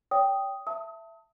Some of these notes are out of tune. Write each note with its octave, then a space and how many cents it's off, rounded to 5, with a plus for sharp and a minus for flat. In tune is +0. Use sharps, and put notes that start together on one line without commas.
C#5 +40 G5 +0 D#6 +0
E5 +10 A5 +20 D#6 +35